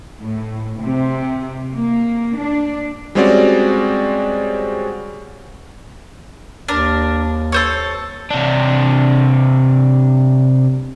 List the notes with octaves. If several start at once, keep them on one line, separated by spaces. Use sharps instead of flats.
A2
C3
A#3
D4
G3 G#3 C4 C#4 F#4 D5
D#2 D4 A#4
A4 C5 C#5
C3 D4